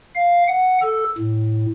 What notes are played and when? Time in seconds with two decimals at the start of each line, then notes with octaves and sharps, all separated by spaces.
0.16 F5
0.48 F#5
0.82 A4
1.18 A2